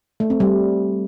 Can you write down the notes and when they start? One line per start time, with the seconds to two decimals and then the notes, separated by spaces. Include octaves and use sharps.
0.20 A3
0.30 C4
0.40 G3